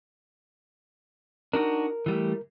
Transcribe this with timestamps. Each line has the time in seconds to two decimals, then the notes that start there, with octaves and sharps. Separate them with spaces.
1.53 D4 D#4 F#4 A#4
2.06 E3 G3 A3